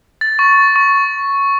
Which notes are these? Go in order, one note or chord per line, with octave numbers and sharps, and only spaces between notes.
A6
C#6
C#6